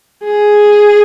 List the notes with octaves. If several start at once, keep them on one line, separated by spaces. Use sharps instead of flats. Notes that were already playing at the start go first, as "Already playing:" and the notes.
G#4